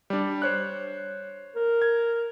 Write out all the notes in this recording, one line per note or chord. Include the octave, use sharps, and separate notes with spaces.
G3 D4
C5 C#5 F#6
A#4
G#6